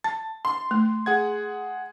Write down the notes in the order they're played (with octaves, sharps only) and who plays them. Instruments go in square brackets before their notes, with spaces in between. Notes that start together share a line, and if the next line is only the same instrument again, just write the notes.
[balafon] A5 [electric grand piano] A6
[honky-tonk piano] C6
[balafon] A3
[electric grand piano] G#4 F#5 G#6